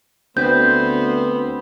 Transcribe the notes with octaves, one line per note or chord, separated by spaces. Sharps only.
D2 B3 C4 C5 G6